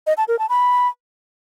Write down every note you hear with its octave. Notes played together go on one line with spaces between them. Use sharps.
D#5
A5
A#4
A5
B5